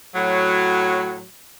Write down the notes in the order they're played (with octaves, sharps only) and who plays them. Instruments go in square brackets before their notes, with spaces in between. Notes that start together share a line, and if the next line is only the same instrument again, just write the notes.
[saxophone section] A2 F#3